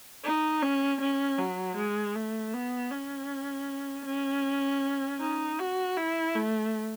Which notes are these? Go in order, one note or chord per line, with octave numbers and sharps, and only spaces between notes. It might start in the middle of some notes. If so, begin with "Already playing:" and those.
D#4
C#4
C#4
F#3
G#3
A3
B3
C#4
C#4
D#4
F#4
E4
A3